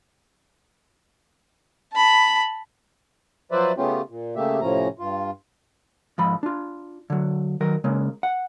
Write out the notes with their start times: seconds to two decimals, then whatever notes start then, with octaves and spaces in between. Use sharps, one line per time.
1.93 A5 B5
3.52 F3 F#3 B4 C5 D5 E5
3.77 C#3 A3 B3 C#4 F4 G4
4.10 A#2
4.36 C#3 A3 A#3 G4 E5
4.61 A2 C3 F3 C#4 A#5
4.99 G2 F4
6.18 G#2 F3 B5
6.43 D4 F4
7.10 D3 F#3
7.61 D#3 F#3 A#4
7.84 C#3 G#3 A#3
8.23 F#5